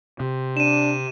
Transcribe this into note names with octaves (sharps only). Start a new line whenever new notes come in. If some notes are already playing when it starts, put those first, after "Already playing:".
C3
D4 D#7 E7